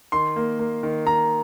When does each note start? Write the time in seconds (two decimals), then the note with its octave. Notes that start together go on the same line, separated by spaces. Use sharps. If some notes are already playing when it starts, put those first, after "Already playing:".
0.12 D#3 C6
0.36 A#3
0.59 A#3
0.83 D#3
1.06 D#3 A#5